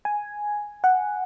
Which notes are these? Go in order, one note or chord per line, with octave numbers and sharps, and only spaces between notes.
G#5
F#5